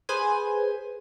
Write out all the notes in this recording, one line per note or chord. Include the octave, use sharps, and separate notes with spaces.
G#4 B4 C5 G#5